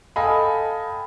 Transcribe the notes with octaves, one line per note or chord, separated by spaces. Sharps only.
A4 D#5 F5 G5 G#5 B5